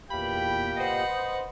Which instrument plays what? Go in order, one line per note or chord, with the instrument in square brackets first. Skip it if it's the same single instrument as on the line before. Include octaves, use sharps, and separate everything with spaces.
[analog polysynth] E2 B5 [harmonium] A#2 G4 F5 [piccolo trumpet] G5
[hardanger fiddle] B4 F#5 [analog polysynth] C5 D#5